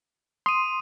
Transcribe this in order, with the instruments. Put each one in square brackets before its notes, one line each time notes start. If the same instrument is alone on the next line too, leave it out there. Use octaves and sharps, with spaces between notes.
[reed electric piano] C6 [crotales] D#6 D#7